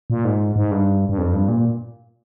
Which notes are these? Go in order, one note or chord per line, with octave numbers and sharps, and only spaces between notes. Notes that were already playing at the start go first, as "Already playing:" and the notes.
A#2
G#2
G#2
G2
G2
F2
G2
A#2